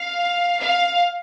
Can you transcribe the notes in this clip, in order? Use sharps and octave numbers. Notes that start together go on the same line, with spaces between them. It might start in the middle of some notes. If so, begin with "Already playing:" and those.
Already playing: F5
F5